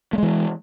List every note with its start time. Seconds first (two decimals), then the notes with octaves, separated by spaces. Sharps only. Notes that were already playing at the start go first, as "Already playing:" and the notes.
0.13 A3
0.18 G#3
0.23 E3